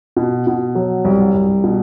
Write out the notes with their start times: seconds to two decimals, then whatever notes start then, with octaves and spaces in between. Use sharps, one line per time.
0.16 B2
0.47 B2
0.75 F#3
1.05 C2
1.34 C2
1.64 B2